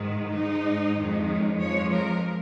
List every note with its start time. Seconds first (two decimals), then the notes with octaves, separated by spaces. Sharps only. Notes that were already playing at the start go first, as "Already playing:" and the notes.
Already playing: G#2 D#3 G#3
0.30 G#2 G#3 D#4
0.95 F2 D#3 G#3
1.27 C#4
1.59 F2 F3 G#3 C#5
1.92 A#4